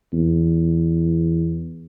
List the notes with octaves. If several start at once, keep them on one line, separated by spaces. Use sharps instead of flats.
E2